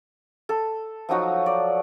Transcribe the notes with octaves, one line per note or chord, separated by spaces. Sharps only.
A4
F3 F#3 D#4 F#4
D5